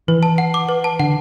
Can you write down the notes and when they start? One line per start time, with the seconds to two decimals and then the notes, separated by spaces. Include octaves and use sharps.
0.08 E3 B4
0.23 A5
0.38 F#5
0.54 D6
0.69 B4
0.84 A5
0.99 D3 F#5